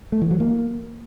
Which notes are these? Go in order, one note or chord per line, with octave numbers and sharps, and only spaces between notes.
A3
E3
F#3
A#3